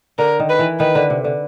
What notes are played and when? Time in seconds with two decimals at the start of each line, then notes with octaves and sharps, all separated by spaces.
0.18 D3 A#4
0.40 D#3
0.49 B4
0.59 E3
0.80 D#3 B4
0.95 D3
1.10 C3
1.24 D3